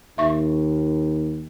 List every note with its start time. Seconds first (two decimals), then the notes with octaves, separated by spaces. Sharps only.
0.18 D#2 E5 C#6